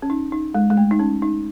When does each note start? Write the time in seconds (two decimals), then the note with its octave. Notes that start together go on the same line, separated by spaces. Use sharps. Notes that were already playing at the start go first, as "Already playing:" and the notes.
0.02 C#4
0.10 D#4
0.32 D#4
0.54 G#3
0.70 G#3
0.77 A3
0.91 D#4
0.99 C#4
1.22 D#4